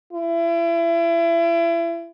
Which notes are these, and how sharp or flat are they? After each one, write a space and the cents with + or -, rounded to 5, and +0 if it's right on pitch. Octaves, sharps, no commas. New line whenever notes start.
E4 +35